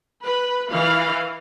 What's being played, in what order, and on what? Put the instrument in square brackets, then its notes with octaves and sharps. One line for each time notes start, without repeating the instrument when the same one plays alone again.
[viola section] B4
E3 F5